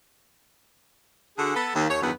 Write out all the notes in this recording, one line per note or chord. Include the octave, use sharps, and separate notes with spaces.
D3 D4 F#4 G#4
B3 A4
D#2
D#2 C#5
E2 G2 D#3 F#3 B3